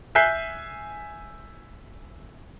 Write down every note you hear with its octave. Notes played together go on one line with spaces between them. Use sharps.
E5 G#5 F#6 G6 B6 C7